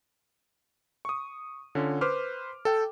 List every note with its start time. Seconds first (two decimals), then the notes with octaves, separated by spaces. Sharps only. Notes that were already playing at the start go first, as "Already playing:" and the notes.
1.05 C#6 D#6
1.75 D3 C#4 F4
2.01 B4 C5 C6 D6 F6
2.65 A4 G5